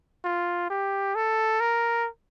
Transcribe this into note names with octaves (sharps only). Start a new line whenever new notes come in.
F4
G4
A4
A#4